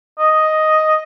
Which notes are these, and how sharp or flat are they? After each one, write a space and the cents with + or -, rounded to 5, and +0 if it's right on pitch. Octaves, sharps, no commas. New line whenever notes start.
D#5 +5